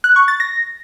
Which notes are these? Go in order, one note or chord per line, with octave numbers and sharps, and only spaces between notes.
F#6
C#6
A6
A#6